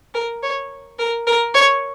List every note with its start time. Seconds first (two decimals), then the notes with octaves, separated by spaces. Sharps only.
0.14 A#4
0.43 C#5
0.99 A#4
1.27 A#4
1.54 C#5